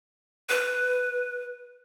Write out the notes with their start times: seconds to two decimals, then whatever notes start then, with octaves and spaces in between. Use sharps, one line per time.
0.49 B4